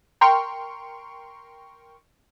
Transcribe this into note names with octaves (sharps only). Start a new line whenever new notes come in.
A#4 G5 C6 C#6 F6